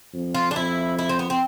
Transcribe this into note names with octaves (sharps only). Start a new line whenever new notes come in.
F2
F4
D4
F2 E4
E4
C4
B3
C4